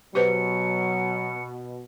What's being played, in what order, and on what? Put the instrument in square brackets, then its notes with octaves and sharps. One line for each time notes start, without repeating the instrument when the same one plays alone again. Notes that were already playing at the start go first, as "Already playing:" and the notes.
[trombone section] B2 [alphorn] F#3 [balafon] G4 B4 C5 [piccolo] C#7